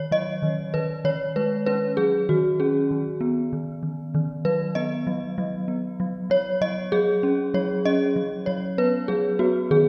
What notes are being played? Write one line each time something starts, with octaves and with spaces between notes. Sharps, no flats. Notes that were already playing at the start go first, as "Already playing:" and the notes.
Already playing: D#3 C#5
F#3 D#5
D#3
D#3 B4
D#3 C#5
G#3 B4
C#4 B4
F#3 G#4
D#3 F#4
C#4 G#4
D#3
B3
D#3
D#3
D#3
F#3 B4
B3 D#5
F#3
F#3
B3
F#3
F#3 C#5
F#3 D#5
F#3 G#4
C#4
F#3 C#5
C#4 D#5
F#3
F#3 C#5
B3 B4
F#3 G#4
B3 F#4
D#3 G#4